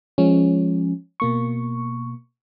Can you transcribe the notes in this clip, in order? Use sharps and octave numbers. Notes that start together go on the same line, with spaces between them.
F3 G#3 C#4
B2 A#3 C#6